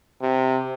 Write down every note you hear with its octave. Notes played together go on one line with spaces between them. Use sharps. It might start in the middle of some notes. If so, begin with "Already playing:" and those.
C3